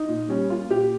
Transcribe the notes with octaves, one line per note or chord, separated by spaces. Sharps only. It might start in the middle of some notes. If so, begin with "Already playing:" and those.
Already playing: D#4
A#2
G3 C#4
A#3 F4
A#2 G4